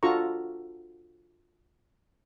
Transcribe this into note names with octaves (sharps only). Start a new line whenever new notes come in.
D4 F4 F#4 A4 A#5 C#6